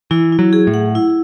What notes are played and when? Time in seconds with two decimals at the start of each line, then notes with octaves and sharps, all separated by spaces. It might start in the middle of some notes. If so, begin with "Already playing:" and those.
0.11 E3 E4
0.32 E4
0.39 F#3
0.53 G#4
0.67 A2
0.74 F#5
0.95 E4